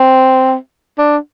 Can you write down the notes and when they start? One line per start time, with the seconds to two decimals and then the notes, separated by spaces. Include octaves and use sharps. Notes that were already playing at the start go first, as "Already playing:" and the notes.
Already playing: C4
0.98 D4